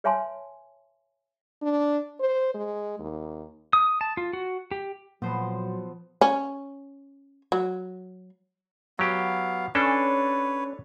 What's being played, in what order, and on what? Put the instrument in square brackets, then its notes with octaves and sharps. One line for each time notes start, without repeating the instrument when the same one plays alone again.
[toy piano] B4 C#5 E5 G#5 A5 C6
[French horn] D4
C5
G#3
D#2
[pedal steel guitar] D#6
A5
F4
F#4
G4
[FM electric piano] A#2 [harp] F3 C5 [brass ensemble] F#3 [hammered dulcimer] B3 A4 C6
[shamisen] C#4
F#3
[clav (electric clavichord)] F#3 G4 [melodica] B3 F5
[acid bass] C#4 [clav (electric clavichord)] D4 A4 [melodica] B4 C#5